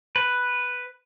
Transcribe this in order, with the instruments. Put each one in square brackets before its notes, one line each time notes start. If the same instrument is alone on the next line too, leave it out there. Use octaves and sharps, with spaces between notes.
[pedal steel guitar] B4